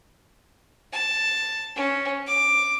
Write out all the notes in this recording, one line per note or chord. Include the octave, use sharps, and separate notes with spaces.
A5
C#4
D6